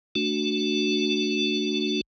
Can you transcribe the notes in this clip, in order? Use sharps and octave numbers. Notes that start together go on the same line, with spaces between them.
A3 D4 F#4